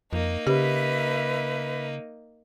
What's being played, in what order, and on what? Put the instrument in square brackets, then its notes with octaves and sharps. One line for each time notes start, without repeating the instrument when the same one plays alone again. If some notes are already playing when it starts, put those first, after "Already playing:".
[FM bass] F2 [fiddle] A#3 D#4
[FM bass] C#3 [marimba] G4 [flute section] B4 E5